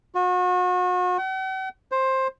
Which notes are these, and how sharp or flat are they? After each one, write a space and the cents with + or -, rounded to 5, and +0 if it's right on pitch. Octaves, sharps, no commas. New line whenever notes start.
F#4 -35
F#5 +45
C5 +15